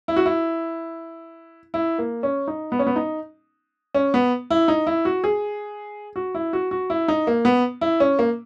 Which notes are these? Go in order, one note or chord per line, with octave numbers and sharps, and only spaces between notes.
E4
F#4
E4
E4
A#3
C#4
D#4
B3
C#4
B3
D#4
C#4
B3
E4
D#4
E4
F#4
G#4
F#4
E4
F#4
F#4
E4
D#4
A#3
B3
E4
C#4
A#3